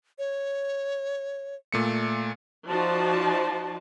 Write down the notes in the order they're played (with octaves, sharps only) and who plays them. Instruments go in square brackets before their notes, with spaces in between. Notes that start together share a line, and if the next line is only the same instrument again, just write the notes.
[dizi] C#5
[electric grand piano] A#2 A3 C#7
[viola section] F3 D#4 F#4 C5 D5 A5